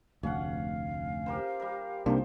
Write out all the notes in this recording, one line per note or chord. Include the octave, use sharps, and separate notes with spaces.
F1 D2 C#4 F5 F#5
G4 A#4 C5
G3 A#4
C2 C3 F3 A#3 D4 D#4 C5